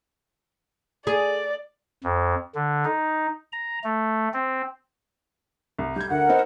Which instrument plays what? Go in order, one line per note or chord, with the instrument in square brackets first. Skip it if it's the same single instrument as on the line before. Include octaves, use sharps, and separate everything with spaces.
[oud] G#4 [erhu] D5
[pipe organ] F2
D3
D#4
A#5
A3
C4
[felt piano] C2
[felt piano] G3 G#6 [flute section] G6
[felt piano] D2 [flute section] A#4 F#5
[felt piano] B3 C4 D#4